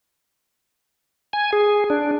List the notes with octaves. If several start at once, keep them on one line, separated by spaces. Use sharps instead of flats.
G#5
G#4
D4